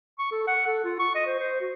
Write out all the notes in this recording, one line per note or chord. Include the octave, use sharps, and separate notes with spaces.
C#6
A4
F#5
A4
F4
C#6
D#5
C5
C5
F#4